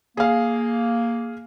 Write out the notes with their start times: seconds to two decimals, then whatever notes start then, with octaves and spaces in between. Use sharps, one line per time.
0.17 A#3 G#4 F5